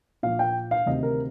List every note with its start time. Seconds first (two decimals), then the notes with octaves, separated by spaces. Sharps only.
0.23 A#2 F3 A#3 F5
0.39 G5
0.71 F5
0.86 D2 C3 D#3 D#5
1.03 A#4